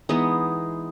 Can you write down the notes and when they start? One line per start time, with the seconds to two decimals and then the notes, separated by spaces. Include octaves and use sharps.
0.09 E3 G#3 B3 D#4